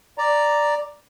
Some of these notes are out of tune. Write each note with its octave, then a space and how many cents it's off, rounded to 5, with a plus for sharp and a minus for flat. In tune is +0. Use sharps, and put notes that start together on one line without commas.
D5 +0 A#5 +0